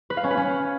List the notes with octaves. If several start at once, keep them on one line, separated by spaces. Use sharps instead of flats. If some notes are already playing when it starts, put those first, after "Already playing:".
B4
F5
C#4
B4
C#4